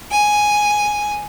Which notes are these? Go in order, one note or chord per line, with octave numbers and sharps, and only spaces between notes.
G#5